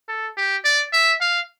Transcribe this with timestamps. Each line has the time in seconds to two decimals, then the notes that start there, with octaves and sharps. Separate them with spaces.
0.08 A4
0.37 G4
0.64 D5
0.92 E5
1.21 F5